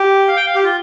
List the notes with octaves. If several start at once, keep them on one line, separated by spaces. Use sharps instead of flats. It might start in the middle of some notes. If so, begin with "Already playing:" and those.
Already playing: G4
F5
G5
F5
G4
F4